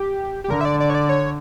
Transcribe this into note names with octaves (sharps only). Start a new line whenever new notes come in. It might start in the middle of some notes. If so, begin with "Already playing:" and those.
Already playing: G4
G4
D3 A#4
E5
D5
D5
C#5
D5
C#5